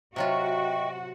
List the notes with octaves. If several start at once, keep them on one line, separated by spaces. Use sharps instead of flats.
C3 F#3 F4 F#4 D#5 E5 G5 C#6